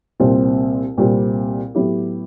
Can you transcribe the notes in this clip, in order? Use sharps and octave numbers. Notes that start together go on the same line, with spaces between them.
C2 A#2 G3 C4
C2 A#2 G3 C4
A2 F#3 B3 E4 G4